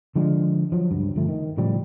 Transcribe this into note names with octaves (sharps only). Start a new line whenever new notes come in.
D3 F3 G#3 D4
F3 F#3
C#2 G2
G1 F3 A3
D#3
A2 C#3 F3 G3